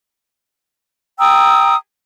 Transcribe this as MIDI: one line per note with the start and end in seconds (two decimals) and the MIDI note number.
1.19 1.75 79
1.19 1.75 82
1.19 1.75 87
1.19 1.75 88